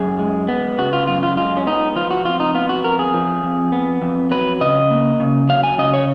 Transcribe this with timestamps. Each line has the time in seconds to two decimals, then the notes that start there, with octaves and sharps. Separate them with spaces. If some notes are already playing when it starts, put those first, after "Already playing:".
Already playing: F#2 G#4
0.19 G#3
0.48 B3
0.78 C#3 F#4
0.93 F4
1.07 F#2 F4
1.23 F4
1.37 G#3 F4
1.57 C#4
1.66 B3 D#4
1.96 F3 F4
2.11 F#4
2.25 F2 F4
2.40 D#4
2.55 B3 F4
2.69 F#4
2.84 F2 A#4
2.99 G#4
3.14 F3
3.43 F2
3.72 B3
4.02 F2
4.31 F#3 B4
4.61 C#3 D#5
4.91 A#3
5.20 C#3
5.49 F#3 F5
5.63 G#5
5.78 C#3 D#5
5.94 C#5